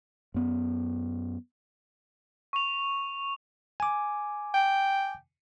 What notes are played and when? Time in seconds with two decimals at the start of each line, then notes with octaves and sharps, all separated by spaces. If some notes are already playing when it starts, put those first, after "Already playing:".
0.34 F#2 B3
2.53 C#6 F7
3.80 G#5 D6
4.54 G5